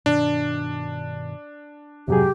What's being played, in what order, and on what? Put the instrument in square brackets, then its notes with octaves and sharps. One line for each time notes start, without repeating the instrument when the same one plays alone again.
[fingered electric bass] G2 B2 D#3 [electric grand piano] D4
[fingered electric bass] F2 G#2 G#3 [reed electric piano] C3 F#3 G#4 [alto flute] G4